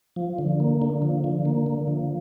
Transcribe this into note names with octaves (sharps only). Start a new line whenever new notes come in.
F3
D3
A#3
D3
F3
D3
A#3
D3
F3